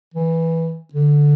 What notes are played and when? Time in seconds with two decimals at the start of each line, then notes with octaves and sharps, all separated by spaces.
0.14 E3
0.93 D3